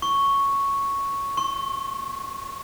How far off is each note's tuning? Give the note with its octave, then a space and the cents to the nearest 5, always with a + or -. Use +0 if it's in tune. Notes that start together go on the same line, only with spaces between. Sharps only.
C#6 +0
C#6 -45